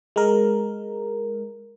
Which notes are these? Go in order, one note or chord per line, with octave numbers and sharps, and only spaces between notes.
G#3 A#4